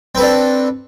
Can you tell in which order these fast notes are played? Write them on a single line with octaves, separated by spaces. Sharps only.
C4 B4 A4 D4